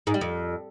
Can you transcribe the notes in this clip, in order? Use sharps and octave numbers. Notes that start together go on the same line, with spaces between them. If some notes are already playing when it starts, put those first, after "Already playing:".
G#2
G3
F2